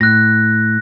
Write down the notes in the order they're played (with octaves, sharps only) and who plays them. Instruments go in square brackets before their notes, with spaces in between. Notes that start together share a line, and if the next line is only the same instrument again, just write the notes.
[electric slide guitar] A2 [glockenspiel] F#6 A#6